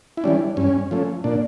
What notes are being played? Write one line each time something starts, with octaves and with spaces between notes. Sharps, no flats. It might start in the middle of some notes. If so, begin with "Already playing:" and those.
E4
E3 G3 C#4 D4
G2 C#4
F3 A3 C#4
A#2 D4